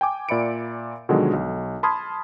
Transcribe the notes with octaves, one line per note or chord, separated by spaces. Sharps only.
G5 G#5 D6
A#2 D5 E5 B5 C#7 D7
B2 D3 D#3 F3 F#3 G#3
B1
A5 B5 C6 D#6 F6 G#6